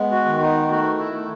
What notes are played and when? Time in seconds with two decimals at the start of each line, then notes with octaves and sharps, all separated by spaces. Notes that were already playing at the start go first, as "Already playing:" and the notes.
Already playing: G#3 B3
0.11 F#4
0.26 D#3
0.40 D#4
0.68 A3 F#4
0.98 E4
1.13 A3